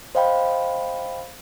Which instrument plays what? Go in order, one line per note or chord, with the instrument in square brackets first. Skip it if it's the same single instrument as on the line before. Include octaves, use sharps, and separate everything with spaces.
[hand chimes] C5 D#5 F5 G5 B5